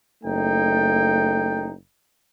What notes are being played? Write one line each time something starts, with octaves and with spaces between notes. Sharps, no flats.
F#1 A3 D#4 G5